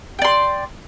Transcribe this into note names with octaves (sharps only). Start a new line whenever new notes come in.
D5 G5 C6